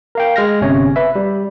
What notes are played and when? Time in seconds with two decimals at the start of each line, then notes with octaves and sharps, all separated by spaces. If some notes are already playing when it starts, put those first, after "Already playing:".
0.15 A#4 F5 G5
0.36 G#3 F6 A#6
0.61 G1 C3 C#4 C#5
0.96 B4 E5
1.15 G3